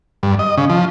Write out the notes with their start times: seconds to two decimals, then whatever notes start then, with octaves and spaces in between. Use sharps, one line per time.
0.23 G2
0.39 D#5
0.58 C#3
0.70 F3